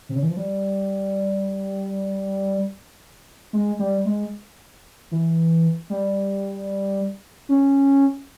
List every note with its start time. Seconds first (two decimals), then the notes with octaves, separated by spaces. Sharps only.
0.09 C3
0.15 C#3
0.23 E3
0.30 F3
0.37 G3
3.53 G#3
3.79 G3
4.05 G#3
5.11 E3
5.90 G3
7.49 C#4